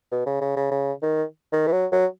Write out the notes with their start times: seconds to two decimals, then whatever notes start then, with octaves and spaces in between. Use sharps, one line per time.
0.12 B2
0.26 C#3
0.41 C#3
0.57 C#3
0.71 C#3
1.02 D#3
1.53 D#3
1.67 E3
1.72 F#3
1.92 F#3